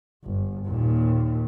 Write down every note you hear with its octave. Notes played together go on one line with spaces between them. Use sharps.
G1
D#2 A#2